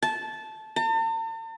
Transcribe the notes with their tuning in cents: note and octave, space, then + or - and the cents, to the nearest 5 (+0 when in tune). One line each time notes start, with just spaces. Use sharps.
A5 -15
A5 +45